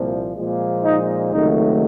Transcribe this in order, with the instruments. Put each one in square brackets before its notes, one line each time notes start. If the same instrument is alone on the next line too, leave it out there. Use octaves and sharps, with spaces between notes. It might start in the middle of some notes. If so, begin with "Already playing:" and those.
Already playing: [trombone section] C2 A#2 F3
A#2 F3 G#3
D#4
C#2 C3 D#3 F#3 A3 D#4